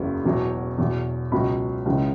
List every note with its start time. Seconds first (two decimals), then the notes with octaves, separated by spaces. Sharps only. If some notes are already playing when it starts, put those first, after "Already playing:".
Already playing: F#1 E2 C#3 F#3
0.24 E1 E2 B2 F#3
0.78 E2 B2 F#3
1.32 C#2 B2 F#3 B5
1.86 C#2 C#3 E3 G#3